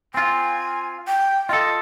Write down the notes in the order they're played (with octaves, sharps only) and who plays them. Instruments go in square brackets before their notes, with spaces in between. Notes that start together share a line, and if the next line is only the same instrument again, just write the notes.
[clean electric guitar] C4 F4 [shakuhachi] G#5
[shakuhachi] G5
[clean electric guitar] F4 A4 [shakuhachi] D#5